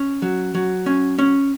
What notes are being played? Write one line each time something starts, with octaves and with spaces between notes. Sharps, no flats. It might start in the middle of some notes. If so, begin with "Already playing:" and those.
Already playing: C#4
F#3
F#3
C#4
C#4